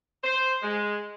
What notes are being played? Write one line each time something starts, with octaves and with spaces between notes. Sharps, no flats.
C5
G#3